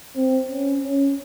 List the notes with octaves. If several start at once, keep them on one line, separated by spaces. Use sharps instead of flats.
C4
C#4
C#4